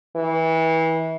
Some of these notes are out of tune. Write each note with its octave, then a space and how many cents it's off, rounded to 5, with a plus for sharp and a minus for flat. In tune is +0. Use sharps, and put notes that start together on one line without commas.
E3 -30